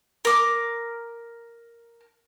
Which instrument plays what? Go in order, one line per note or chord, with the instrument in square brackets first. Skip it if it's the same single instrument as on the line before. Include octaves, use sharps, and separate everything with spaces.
[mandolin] A#4 D6